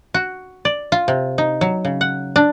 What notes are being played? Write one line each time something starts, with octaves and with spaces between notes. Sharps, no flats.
F#4
D5
F4
C3
D#4
F#3
C#3
F#5
D4